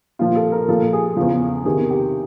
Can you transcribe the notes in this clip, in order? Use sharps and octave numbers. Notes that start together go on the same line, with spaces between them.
A#2 F3 F4
A4
A#4
A#2 F3 A4
G#4
E2 C#3 F3
E2 C3 D#3 G#4
G4